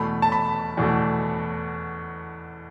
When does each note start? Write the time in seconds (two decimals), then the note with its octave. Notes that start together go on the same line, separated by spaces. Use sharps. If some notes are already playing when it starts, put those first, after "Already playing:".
Already playing: E2 B2 A3 B5
0.22 A5
0.32 B5
0.77 E2 B2 A3